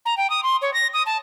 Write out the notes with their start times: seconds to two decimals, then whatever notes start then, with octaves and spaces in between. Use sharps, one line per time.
0.06 A#5
0.17 G5
0.30 D#6
0.43 C6
0.62 C#5
0.74 A#6
0.93 D#6
1.06 A5